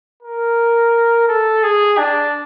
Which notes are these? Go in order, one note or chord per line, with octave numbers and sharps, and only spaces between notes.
A#4
A4
G#4
D4